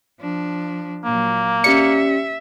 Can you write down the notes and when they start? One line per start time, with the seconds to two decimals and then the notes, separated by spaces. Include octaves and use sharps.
0.20 F3 D4
1.04 A#2 F#3 A#3
1.64 C#4 G4 D5 E5 C#7